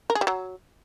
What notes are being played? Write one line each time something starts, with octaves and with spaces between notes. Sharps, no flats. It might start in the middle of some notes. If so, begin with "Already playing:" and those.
A#4
G#4
G3
F#3